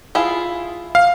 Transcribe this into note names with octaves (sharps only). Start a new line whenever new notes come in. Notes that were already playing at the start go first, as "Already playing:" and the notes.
E4 F4 G#4
F5